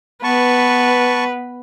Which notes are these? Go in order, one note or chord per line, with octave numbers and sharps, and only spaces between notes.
B3 B4 A5 C#6